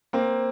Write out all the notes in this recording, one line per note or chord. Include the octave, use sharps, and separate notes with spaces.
A#3 C4